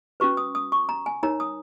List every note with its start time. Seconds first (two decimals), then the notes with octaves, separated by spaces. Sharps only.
0.20 C#4 F#4 B4 C#6
0.37 D#6
0.55 D#6
0.72 C#6
0.89 A#5
1.06 G#5
1.23 D#4 A#4 C#5 A#5
1.40 D#6